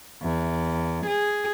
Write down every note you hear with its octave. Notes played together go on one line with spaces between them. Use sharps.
E2
G#4